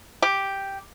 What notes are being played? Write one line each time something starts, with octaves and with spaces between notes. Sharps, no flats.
G4